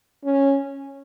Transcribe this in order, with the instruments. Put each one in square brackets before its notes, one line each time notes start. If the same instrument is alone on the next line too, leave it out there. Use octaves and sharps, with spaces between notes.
[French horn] C#4